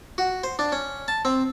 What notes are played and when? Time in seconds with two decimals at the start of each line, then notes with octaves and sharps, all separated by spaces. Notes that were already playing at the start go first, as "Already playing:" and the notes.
0.18 F#4
0.44 C5
0.59 D4
0.72 C#4
1.08 A5
1.25 C4